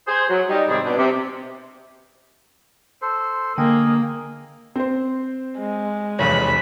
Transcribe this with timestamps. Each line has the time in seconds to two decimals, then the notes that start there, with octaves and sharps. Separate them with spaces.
0.07 G#4 C5
0.29 F#3
0.48 G3 D#4
0.68 G#2 C3 D#3 G3 C4 G#4
0.85 B2 D4
0.97 C3
3.02 A4 C5
3.58 D3 A#3 G#4 A#4 D#5 G5
4.76 C4 C5
5.58 G#3
6.19 F1 B1 E2 C#5 B5